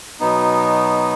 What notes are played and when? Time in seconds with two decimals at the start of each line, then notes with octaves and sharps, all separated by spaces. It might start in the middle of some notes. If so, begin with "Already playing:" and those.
0.20 B2 F#3 B3 D#4